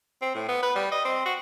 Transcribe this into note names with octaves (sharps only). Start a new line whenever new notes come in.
C4
A2
B3
B4
G3
D#5
C4
F#4